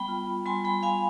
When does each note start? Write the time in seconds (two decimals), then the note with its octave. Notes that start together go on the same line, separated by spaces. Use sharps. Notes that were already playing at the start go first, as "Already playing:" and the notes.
Already playing: G3 B3 G5 B5
0.08 F4
0.28 F4
0.46 G3 G#5 C6
0.64 G3 G5 B5
0.83 G3 F5 G#5